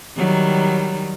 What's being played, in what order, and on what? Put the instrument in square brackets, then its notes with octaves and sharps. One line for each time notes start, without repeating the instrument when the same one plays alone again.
[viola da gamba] D#3 F#3 G3